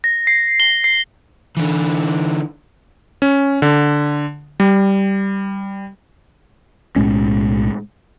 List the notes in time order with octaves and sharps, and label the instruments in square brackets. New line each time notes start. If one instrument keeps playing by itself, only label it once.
[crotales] A#6
C7
G7
C7
[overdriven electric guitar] D3 E3
[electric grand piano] C#4
D3
G3
[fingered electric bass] B1 A2 G#3 C#4